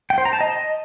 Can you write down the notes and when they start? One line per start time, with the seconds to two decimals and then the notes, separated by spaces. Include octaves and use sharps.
0.10 G5
0.18 C5
0.25 A#5
0.33 A5
0.41 D#5